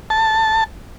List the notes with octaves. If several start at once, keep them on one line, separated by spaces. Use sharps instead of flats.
A5